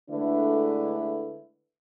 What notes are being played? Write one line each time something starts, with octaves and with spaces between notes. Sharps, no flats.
D3 G#3 A3 D4 E4 B4